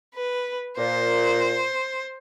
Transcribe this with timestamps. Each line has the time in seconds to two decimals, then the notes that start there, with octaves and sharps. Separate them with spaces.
0.15 B4
0.77 A#2 C5